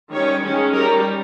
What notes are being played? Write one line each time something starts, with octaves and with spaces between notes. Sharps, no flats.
D#3 G3 C#4 C#5
D#3 G#3 C#4
G3 C#4 A#4